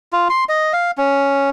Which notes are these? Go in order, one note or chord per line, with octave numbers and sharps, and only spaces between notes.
F4
C6
D#5
F5
C#4